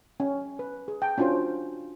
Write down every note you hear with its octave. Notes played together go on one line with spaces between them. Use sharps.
C#4
B4
G#4
G5 A5
C#4 D4 F4 F#4 C5